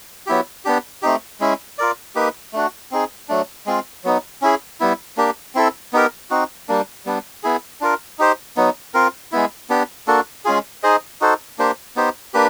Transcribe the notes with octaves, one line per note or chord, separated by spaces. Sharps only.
F#3 B3 E4 G4
B3 D4 G4
A3 C4 D#4 G4
G#3 C#4 E4
F4 A#4 D5
A#3 D#4 G4 B4
A3 D4 F#4
C4 D#4 G#4
F#3 A3 D4
G#3 C4 F4
F#3 B3 D#4
C#4 E4 G#4
G3 B3 E4
A#3 D4 G4
C4 E4 A4
B3 D#4 G4 A#4
C4 D#4 F#4
G3 A#3 D4
G3 B3 D4
B3 E4 G#4
D4 F4 A#4
D#4 G4 C5
F#3 B3 D#4
C4 F4 A#4
G#3 B3 E4
B3 D4 G4
A#3 D4 F#4 A4
G#3 C#4 F4 G#4
D#4 G#4 C5 D#5
D#4 F#4 A4 C5
A#3 D4 G4 C5
B3 D#4 G4 C5
A#3 D4 G4 B4